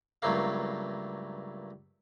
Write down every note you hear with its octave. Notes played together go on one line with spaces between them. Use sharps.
C#2 G2 F#3 A3 A#3 F5